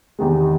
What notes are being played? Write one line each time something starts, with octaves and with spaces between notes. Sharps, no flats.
E2 C3 D#3 G#3